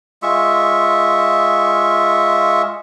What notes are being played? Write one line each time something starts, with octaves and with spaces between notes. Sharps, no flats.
G#3 F4 E5 C#6